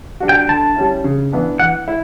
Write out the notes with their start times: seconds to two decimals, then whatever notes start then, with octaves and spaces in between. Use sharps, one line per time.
0.20 G3 D4 F#4
0.29 G5
0.49 D3 A5
0.76 G3 C#4 E4
1.04 C#3
1.33 E3 B3 D4
1.60 E3 F#5
1.88 E4